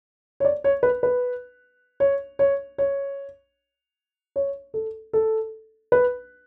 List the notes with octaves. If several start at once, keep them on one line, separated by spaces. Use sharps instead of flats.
C#5
D5
C#5
B4
B4
C#5
C#5
C#5
C#5
A4
A4
B4